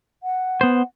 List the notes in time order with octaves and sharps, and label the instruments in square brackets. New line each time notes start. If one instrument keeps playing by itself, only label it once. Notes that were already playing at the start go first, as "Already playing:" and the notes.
[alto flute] F#5
[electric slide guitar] B3 C5